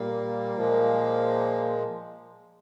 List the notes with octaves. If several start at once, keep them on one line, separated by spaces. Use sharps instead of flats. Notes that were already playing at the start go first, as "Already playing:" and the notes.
Already playing: A#2 G3 A#3
A#2 F3 G#3